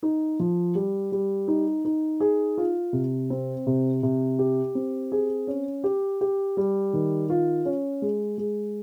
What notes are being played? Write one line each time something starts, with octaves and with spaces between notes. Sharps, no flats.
D#4
F3
G3
G3
D#4
D#4
G#4
F4
C3
C4
C3
C3
G4
C4
G#4
C#4
G4
G4
G3
D#3
F4
C#4
G#3
G#3